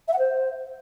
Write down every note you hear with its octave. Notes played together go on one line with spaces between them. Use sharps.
E5
F#5
C5